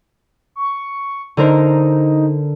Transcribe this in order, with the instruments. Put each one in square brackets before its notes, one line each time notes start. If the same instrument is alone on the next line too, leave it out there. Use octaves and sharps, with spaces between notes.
[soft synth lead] C#6
[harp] D3 A#4 C5 [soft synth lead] D#4